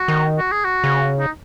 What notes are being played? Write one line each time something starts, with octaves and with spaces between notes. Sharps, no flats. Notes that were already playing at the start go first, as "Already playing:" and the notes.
Already playing: F#4
D#3
F#4
G#4
F#4
C#3
D#4